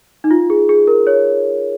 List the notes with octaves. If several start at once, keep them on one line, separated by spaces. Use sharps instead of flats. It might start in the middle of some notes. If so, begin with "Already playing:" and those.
D#4
F4
G#4
G#4
A#4
C#5